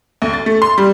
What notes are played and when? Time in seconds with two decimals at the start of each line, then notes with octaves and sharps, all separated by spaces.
0.22 D2
0.33 A6
0.46 A3
0.62 C6
0.78 G3